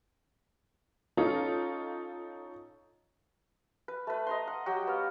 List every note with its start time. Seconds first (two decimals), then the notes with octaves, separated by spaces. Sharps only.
1.17 C#4 D#4 F4 A4
3.88 B4
4.07 A3 B4
4.27 D#5 A#5 C6
4.47 F#5
4.66 F#3 F#4 G4 G5
4.87 B3 F5